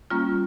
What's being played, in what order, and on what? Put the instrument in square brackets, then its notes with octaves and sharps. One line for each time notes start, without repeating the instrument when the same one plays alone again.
[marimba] G3 A#3 C#4 F4